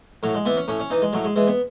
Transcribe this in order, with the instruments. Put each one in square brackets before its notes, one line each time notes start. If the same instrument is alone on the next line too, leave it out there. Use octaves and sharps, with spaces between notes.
[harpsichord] A2 F#3
G#3
E3 B3
C#4
A2 C#4
C#4
E3 D#4
G#3
A2 F#3
G#3
E3 G#3
B3